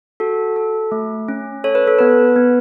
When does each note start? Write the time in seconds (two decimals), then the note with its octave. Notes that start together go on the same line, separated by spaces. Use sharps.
0.20 F#4 A4
0.56 A4
0.92 A3
1.28 C#4
1.64 A4 C#5
1.75 B4
1.87 A4
1.99 B3 B4
2.36 B3